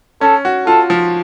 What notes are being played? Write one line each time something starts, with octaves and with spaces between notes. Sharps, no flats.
C#4 A4
F#4
F4 A4
F3